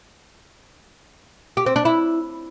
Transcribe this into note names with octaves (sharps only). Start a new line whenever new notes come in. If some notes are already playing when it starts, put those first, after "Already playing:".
G4
C4
D4
E4